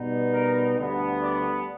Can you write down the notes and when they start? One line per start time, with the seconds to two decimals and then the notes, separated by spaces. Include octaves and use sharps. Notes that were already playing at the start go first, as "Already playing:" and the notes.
Already playing: B2 G3 B3 D#4
0.33 A#4
0.78 D2 D3 G3 B3
1.22 D5